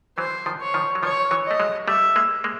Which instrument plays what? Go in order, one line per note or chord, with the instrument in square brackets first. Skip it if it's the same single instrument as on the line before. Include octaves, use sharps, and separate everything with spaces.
[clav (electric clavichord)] E3 F#3 [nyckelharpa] C5
[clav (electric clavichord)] D#3 F3
[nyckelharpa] C#5
[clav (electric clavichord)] D#3 F3
F#3
[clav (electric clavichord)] D#3 F3 [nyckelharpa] C#5
[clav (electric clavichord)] E3 F#3
[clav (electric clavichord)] A3 [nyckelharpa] D#5
[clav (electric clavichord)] F#3 G#3
[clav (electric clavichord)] G3 A3 [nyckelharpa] E5
[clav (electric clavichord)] G#3 A#3
G#3 A#3